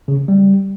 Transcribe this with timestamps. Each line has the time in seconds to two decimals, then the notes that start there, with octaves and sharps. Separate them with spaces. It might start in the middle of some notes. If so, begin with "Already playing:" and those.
0.08 C#3
0.28 G3